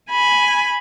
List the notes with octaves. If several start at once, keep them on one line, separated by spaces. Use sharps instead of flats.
G#5 B5